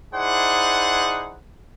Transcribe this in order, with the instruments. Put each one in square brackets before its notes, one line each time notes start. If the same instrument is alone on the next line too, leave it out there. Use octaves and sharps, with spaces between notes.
[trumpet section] D#4 E4 G#4 C5 D5 F#5